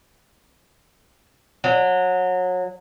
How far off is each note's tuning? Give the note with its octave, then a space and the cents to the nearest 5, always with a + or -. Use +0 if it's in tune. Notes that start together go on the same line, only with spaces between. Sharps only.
F#3 -25